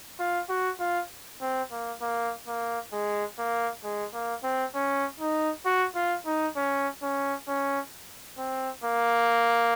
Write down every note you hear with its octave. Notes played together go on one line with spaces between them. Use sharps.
F4
F#4
F4
C4
A#3
A#3
A#3
G#3
A#3
G#3
A#3
C4
C#4
D#4
F#4
F4
D#4
C#4
C#4
C#4
C4
A#3